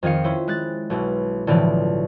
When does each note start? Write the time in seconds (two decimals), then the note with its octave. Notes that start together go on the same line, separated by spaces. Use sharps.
0.03 F2 D#3 G#4 F5 C#7
0.24 C#4 E4 C5
0.48 G#3 F#6 A6
0.90 B1 B2 E4
1.47 B1 A2 D3 E3 F3 D5